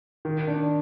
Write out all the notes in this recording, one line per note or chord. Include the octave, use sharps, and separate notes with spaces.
D#3
D4